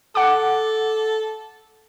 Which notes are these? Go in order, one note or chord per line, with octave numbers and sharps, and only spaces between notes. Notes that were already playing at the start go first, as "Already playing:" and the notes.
A4 F#5 D6